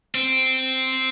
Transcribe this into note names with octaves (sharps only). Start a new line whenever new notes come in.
C4